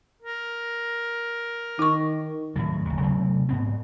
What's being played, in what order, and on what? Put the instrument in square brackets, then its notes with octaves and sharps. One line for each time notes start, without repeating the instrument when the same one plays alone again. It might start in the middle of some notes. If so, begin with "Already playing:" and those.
[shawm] A#4
[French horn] D#3 [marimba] D#4 C#6
[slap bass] A2 D#3 F#3
F#1 D#2
C3 F#3 A3 C4
G#2 B3 C4